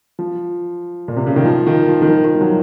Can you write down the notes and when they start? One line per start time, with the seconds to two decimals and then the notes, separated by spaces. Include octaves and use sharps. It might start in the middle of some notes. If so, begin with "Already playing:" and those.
0.19 F3
1.08 A#2
1.17 C3
1.26 C#3
1.36 D#3
1.45 F3
1.67 D#3
1.88 F3
2.02 D#3
2.09 F3
2.24 D#3
2.35 F3
2.41 F#3